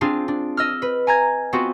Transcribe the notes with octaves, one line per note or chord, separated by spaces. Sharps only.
C4 D4 F4 G#4
D4
D#5 E6 F6
B4
G#5 A#5 G#6
B3 C4 F4 F#4